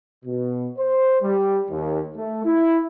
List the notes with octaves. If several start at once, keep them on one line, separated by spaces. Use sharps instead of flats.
B2
C5
G3
D#2
A3
E4